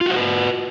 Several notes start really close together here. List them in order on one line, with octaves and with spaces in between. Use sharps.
F4 F#4 C5 B4